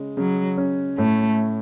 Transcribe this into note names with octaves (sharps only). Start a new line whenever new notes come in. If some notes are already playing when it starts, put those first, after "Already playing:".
Already playing: C#3 G#3
C#3 F#3
C#4
A2 A3